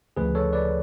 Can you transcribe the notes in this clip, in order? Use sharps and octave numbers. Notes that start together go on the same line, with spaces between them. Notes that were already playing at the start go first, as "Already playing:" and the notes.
D2 C#3 F3 G#4 B4
A4 C#5
B4 D5